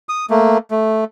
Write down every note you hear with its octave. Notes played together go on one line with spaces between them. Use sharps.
D#6
A3 A#3
A3